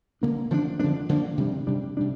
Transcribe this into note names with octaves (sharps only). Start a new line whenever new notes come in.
D3 F3 A#3 D4
D3 F3 A#3 D4
D3 F3 A#3 D4
D3 F3 A#3 D4
C3 G3 D4
C3 G3 D4
C3 G3 D4